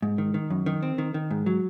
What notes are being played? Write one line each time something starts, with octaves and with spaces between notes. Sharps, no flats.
G#2
D#3
D#3
F#2
D#3
C4
D#3
D#3
G#2
F#3